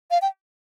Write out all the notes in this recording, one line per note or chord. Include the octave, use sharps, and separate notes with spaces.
F5
G5